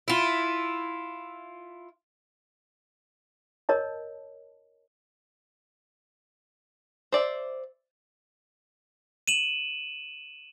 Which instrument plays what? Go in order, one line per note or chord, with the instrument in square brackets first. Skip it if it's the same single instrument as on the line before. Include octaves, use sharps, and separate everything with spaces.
[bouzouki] E4 F4
[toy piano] A#4 C#5 D#5 A5
[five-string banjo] C5 D5 E5
[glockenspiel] D#7 E7 F#7